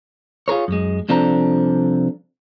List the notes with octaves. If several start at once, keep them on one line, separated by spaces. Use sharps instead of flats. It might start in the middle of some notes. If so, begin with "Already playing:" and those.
F4 G#4 A#4 C#5
F#2 G#3
C2 F3 C4 D4 A4 A#5